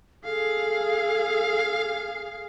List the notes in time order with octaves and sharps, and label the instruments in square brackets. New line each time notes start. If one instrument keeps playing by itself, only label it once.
[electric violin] G#4 F5 [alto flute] A4